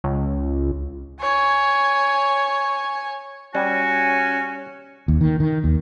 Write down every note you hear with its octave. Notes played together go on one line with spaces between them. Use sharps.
C#2
C#5 G#5
G3 C#4 F#4 G#5
D#2
D#3
D#3
D#2